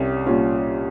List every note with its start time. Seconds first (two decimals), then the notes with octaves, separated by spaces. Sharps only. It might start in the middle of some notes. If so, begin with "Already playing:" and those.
Already playing: C2 G3 C#4
0.26 A#2 G3 C#4 F4